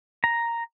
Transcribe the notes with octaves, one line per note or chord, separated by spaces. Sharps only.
A#5